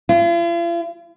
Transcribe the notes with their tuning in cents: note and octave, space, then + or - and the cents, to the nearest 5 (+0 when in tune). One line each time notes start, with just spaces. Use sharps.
F4 -45